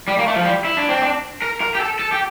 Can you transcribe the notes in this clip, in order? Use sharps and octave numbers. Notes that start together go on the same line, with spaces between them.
G3
A#3
A3
F3
G3
E4
D4
C4
D4
A#4
A#4
G4
A4
A4
G4